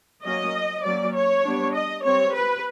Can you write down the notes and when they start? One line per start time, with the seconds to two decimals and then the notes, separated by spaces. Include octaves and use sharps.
0.24 F#3 A#3 C#4 D#5
0.84 F#3 A#3 C#4 D5
1.15 C#5
1.44 G3 B3 D4
1.74 D#5
2.04 G3 C4 C#5
2.34 B4